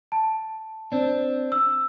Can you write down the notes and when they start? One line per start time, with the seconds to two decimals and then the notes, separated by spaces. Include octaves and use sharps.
0.12 A5
0.92 C4 D4
1.52 E6